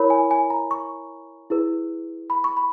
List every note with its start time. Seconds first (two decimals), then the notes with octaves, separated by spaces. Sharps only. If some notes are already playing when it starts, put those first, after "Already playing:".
Already playing: E4 A#4 C#5 B5
0.10 G#5
0.31 G#5
0.50 A#5
0.71 C#6
1.50 E4 G#4 B4
2.30 B5
2.44 C#6
2.57 B5